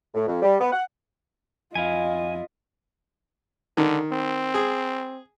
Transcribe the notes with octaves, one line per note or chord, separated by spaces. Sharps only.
A2
F2
G3
B3
F#5
F2 E4 F4 D#5 F5 G#5
D3 D#3
C4
G#4